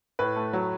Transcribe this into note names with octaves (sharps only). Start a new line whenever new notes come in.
A2 B4
A3
F#3